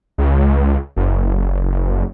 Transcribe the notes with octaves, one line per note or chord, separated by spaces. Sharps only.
C#2
F#1